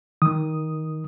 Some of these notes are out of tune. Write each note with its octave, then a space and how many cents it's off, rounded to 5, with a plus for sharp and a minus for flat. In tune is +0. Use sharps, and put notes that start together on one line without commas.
D#3 +10 D#6 +0